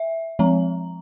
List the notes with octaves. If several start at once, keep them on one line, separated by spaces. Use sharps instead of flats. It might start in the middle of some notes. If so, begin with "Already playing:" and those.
Already playing: E5
F3 G#3 C4 A#5